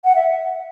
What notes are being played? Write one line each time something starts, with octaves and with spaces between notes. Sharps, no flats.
F#5
E5